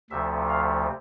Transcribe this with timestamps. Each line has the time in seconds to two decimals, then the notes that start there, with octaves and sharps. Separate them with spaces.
0.10 D2 C3 F3 A3 E5
0.49 F5